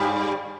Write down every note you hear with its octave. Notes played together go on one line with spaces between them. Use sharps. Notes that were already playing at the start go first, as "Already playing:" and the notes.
Already playing: G2 G3